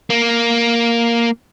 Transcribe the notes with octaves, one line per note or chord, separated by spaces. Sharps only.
A#3